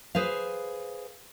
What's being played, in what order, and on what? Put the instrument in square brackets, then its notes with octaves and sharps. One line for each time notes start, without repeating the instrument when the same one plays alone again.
[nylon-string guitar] G#4 B4 C5 F5